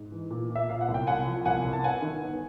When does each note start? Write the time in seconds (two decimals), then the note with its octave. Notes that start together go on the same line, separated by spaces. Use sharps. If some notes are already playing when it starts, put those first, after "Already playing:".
Already playing: G#2
0.12 E3
0.30 A#2
0.50 A#2
0.55 E5
0.69 A#2 F5
0.81 F#5
0.88 C2
0.94 G5
1.07 C2 F#5 G#5
1.27 F3
1.45 C2 F#5 G#5
1.64 C2
1.73 A5
1.84 G2 F#5 G#5
2.02 D#3
2.22 G1